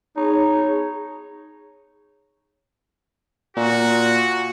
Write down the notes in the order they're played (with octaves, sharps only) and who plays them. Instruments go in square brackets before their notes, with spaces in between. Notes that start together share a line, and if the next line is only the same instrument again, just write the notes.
[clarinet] D#4 [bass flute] G#4 [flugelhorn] C#5
[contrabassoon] A#2 [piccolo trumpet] F#4